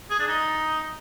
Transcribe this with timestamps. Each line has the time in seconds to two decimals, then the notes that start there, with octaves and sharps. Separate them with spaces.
0.10 G#4
0.19 D4
0.28 D#4